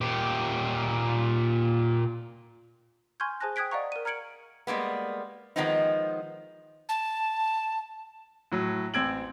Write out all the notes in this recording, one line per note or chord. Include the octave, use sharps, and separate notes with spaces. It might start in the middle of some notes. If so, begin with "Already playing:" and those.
A#2 G4
G#5 C6 C#6 F6 G6 G#6
G#4 C5 G#5 A5 F#6 A#6
G5 D#6 F#6 G#6 B6 D7
D5 D#5 F5 F#5 A#5 C#6
A#4 D#7
A#5 F6 G#6 C#7 D7 F#7
G3 G#3 A#3 B3
D#3 F3 G#3 B3 C4 D#4
A5
A2 F#3
A1 C4 E6 G#6 D7 F#7